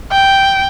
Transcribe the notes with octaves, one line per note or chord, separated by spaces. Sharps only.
G5